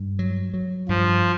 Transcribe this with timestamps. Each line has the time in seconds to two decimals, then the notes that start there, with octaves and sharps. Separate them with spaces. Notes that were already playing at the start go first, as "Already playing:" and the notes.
Already playing: G2
0.19 F#3
0.54 F#3
0.89 G2 F3